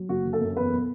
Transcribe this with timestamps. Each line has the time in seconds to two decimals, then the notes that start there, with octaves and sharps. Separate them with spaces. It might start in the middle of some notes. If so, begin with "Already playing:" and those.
Already playing: F#3
0.09 F#1 F#4
0.25 D3
0.33 A4
0.41 F#2
0.56 E2 B4
0.72 B2